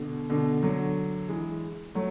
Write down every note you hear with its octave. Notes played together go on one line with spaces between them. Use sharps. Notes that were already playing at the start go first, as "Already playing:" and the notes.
Already playing: B2 D3
B2 D3
D3 F#3
E3 G#3
F#3 A3